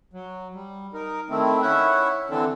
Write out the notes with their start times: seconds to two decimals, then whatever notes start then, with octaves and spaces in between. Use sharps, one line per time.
0.13 F#3
0.54 G3
0.94 D#4 A#4
1.30 D#3 A3 C4 E4
1.62 C#4 E4 E5 F#5
2.30 D3 E3 C4 D4 A4